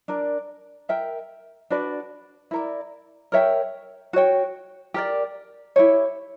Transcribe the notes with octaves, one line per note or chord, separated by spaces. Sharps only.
D4 A#4 D5
A#4 E5 G5
D4 F#4 B4 D5
E4 A#4 D5
A#4 C#5 E5 G5
F#4 C#5 G5
G4 A#4 D5
E4 G4 C#5